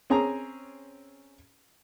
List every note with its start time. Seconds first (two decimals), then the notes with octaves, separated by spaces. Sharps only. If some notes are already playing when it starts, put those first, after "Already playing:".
0.10 C4 C#4 G#4 A#5